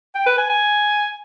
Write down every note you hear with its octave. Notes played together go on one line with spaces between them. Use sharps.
G5
B4
G#5
G#5